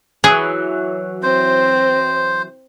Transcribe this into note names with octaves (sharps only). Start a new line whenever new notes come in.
E3 F#3 G#4
C4 C5